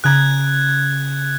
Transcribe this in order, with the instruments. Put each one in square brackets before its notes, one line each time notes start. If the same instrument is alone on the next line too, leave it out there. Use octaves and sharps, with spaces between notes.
[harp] C#3 G#4 A#5 [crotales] F#6 G#6